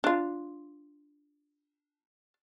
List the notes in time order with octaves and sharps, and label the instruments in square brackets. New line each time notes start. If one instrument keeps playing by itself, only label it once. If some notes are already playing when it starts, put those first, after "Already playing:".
[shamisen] D4 F4